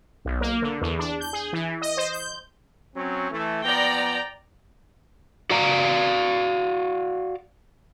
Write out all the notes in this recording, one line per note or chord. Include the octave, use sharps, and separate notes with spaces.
B1
A#3
D3
E2
D4
G6
G#4
E3
D#5
C5
G6
F#3 C4 C#4
E3 A3
F3 B3 D5 G5 A#5
F#4 D5 F5 A#5